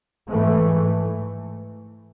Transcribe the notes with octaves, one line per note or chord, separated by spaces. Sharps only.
G#2 E3 A3